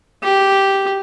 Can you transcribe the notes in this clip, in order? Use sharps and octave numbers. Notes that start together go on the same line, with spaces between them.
G4